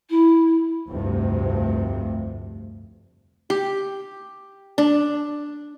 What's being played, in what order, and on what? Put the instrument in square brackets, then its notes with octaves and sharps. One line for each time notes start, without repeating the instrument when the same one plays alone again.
[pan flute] E4
[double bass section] F1 D2 G2 C3
[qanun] G4
D4